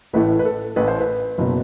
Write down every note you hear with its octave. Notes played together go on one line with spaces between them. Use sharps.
A1 A2 E3 A3 B4
B4
A4
A1 A2 E3 A3 B4
C5
B4
F#1 B2